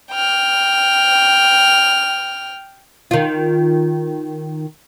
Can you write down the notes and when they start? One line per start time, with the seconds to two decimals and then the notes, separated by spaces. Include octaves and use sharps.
0.12 G5 F6
3.11 D#3 F4